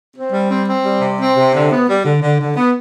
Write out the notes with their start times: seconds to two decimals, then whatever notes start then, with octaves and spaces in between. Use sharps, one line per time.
0.15 C4
0.32 G3
0.49 C4
0.67 C4
0.85 G3
1.01 C3
1.18 C4
1.36 C3
1.53 D3
1.70 B3
1.88 G3
2.04 D3
2.21 D3
2.39 D3
2.56 B3